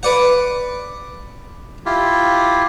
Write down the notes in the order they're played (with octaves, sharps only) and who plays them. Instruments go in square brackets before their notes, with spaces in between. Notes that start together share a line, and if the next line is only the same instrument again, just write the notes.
[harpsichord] B4 D5 F#5
[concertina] E4 F4 G4